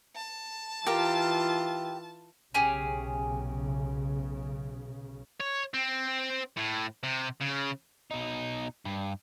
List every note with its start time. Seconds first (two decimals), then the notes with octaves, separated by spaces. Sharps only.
0.16 A5
0.87 E3 F4 G4 A#4 F5
2.54 B1 C#3 C#4 G4 G#4
5.40 C#5
5.74 C4
6.57 A2
7.03 C3
7.40 C#3
8.11 B2 D#4
8.85 G2